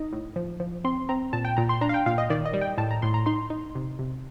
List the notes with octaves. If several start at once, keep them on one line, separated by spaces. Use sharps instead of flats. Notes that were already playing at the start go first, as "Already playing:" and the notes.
Already playing: D#4 D#5
A2
F3
F3
C4 C6
C4 A#5
A#2 A5
G5
A#2 A#5
C6
D4 A#5
F5
G5
A#2 F5
D#5
D#3 D5
D#5
G3
G5
A2 A5
A#5
A2 C6
A#5
D#4 C6
D#4
C3
C3